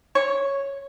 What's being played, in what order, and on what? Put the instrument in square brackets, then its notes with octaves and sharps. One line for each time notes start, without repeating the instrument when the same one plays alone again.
[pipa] C#5